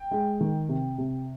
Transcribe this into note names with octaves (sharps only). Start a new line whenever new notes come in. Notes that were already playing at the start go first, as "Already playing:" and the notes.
Already playing: G5
G#3
D#3
C3
C3